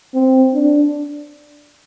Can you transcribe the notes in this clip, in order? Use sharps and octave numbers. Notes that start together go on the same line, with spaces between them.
C4
D4